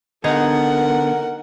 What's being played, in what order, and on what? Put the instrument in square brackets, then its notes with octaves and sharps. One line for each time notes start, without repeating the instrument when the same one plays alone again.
[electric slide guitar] D3 B3 [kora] D#4 G#4 [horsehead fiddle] A#4 F#5